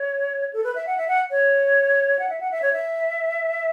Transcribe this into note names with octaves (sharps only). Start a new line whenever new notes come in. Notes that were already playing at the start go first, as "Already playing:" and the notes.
Already playing: C#5
A4
B4
E5
F#5
E5
F#5
C#5
F#5
E5
F#5
E5
C#5
E5